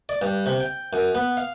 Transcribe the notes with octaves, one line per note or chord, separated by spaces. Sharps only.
D5
G2
C3
G5
F#2
B3
F5